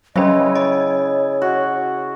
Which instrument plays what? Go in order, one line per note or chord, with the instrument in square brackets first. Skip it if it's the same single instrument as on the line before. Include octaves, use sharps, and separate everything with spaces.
[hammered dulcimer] C#3 E4 [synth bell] F#3 C#4 [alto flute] D#5
[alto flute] C#5 [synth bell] D#5
[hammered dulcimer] F#4